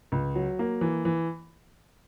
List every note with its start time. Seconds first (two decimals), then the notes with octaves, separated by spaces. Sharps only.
0.12 C#2
0.35 F#3
0.59 A#3
0.81 E3
1.05 E3